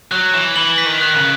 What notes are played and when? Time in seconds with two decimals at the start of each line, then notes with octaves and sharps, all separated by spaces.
0.11 F#3 F#6
0.34 E3 E7
0.56 E3 F#7
0.78 B6
0.85 D#3
1.01 F#6
1.16 C#3